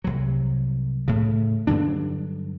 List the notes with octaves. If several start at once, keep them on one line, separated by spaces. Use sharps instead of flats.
C2 F#3
A2 C#3
G2 D3 F#3 D4